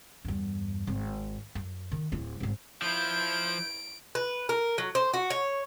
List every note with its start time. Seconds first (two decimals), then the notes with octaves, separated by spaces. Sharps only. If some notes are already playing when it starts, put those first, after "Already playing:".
0.25 E2 G2
0.87 G#1
1.55 F#2
1.91 D#3
2.12 D1 E4
2.40 G#1 G#2
2.82 F3 E4 G6 D7
4.15 B4
4.49 A#4
4.78 F#3
4.95 C5
5.14 F#4
5.30 C#5